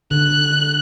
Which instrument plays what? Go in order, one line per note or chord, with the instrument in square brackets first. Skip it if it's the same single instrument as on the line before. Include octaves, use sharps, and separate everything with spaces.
[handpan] D3 [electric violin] F#6